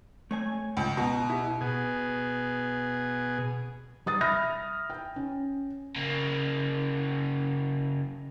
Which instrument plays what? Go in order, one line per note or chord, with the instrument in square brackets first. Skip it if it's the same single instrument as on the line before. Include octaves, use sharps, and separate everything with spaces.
[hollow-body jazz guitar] A3 C#5 G#5
[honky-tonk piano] C#2
[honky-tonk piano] B2 [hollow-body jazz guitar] A#5
[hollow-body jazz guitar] E4 G4
[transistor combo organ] B2 G#4
[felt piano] G3 D#6 A6
E5 B5 D#6 F6 A#6
G5
C#4
[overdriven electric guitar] C#3 A#3